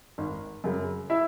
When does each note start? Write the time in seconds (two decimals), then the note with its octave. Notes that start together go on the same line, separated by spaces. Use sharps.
0.18 G#1
0.64 F#2 C#3
1.10 E4 E5